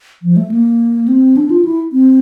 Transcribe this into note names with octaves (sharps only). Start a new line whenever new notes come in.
F3
A3
A#3
C4
D4
F4
E4
C4